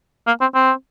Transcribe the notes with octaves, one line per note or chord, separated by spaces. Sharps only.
A#3
C4
C4